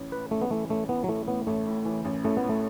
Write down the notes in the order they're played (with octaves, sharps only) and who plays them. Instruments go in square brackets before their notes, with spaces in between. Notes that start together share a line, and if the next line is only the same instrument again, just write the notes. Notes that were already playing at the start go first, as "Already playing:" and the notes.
Already playing: [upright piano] A1
[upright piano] A2 [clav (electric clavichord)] B4
[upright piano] A1 [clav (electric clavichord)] A3
[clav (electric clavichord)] B3
[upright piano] E3 [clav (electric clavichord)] A3
[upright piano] A1 [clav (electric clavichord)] A3
[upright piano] E3 [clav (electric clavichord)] B3
[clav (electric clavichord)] F#3
[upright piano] A2 [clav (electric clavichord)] A3
[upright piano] A2 [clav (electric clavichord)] B3
[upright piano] A1 [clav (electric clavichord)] A3
[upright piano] A2
E3
A1
[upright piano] A1 [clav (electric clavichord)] A3
[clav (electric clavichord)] B3
[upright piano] A2
[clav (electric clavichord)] A3